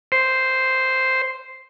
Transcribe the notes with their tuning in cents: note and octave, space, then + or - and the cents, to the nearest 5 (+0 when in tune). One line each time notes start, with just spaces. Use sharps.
C5 -5